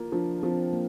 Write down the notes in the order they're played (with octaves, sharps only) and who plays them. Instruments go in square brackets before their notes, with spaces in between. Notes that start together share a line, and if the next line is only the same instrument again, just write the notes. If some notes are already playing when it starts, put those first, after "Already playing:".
Already playing: [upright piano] A#3 F4
[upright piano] F3 [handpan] D4
[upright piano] F3 [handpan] C4
[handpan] A#3